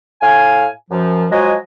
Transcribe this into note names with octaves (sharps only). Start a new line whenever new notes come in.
A2 F5 G#5
F#2 F3
F3 F#3 G#3 D#5 G#5